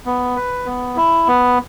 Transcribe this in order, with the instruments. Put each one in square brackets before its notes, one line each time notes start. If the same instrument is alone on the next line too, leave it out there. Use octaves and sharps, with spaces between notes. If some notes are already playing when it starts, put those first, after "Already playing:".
[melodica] B3
B4
B3
E4
B3